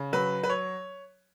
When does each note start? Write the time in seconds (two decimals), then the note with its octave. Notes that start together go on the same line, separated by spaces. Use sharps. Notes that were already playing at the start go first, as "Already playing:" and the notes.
Already playing: C#3
0.13 F#3 B4
0.43 B4
0.50 C#5